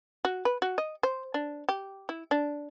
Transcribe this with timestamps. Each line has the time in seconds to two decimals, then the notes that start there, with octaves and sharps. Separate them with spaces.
0.25 F#4
0.45 B4
0.62 F#4
0.78 D#5
1.03 C5
1.34 D4
1.69 G4
2.09 E4
2.31 D4